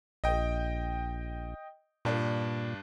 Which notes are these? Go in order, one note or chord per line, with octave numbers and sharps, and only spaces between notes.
A#1 D#5 G5
G2 A#2 D4